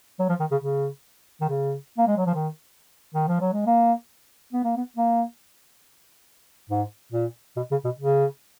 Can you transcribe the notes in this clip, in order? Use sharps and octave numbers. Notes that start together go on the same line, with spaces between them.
F#3
F3
D#3
C#3
C#3
D#3
C#3
A#3
G#3
F#3
F3
D#3
D#3
F3
F#3
G#3
A#3
B3
A#3
B3
A#3
G#2
A#2
B2
C#3
B2
C#3